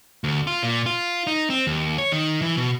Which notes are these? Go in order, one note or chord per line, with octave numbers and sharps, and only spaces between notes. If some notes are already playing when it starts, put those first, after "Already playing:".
D2
F4
A#2
F4
D#4
C4
D#2
C#5
D#3
E3
B2